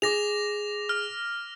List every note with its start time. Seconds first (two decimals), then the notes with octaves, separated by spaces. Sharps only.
0.02 G#4 D6 A#6 F7
0.89 F6